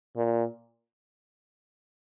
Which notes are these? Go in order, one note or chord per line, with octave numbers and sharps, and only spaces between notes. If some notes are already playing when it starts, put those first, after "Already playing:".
A#2